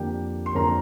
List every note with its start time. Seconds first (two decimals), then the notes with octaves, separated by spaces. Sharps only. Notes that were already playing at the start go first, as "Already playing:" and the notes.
Already playing: F2 D3 A#3 G4 G5
0.46 C6
0.55 F2 D3 A#3 A#4 A#5